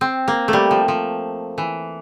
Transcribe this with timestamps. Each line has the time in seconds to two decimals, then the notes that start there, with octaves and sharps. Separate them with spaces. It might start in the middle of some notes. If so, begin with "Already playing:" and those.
0.01 C4
0.28 A#3
0.48 A3
0.53 G3
0.71 F3
0.88 F3
1.58 E3